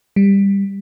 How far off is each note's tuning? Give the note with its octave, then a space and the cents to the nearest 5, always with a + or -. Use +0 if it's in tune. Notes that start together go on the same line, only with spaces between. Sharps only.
G3 +15